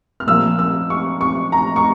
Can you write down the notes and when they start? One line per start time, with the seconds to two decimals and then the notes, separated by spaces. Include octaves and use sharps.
0.20 F6
0.27 A#2 F3 A#3 E6
0.59 E6
0.90 C#6
1.21 C#6
1.52 A#5
1.76 C#6